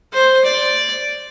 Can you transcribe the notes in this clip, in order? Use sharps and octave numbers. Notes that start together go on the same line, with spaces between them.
C5
D5